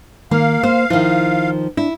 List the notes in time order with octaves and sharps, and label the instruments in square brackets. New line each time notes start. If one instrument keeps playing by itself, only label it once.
[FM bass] D#3 [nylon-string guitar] A#3 [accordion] F5
[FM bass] A#3 [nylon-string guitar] C5
[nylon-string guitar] D#3 F3 [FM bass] E4
[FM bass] D4 [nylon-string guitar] E4